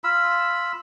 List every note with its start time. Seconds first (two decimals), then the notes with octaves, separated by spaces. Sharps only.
0.04 F4 B5 E6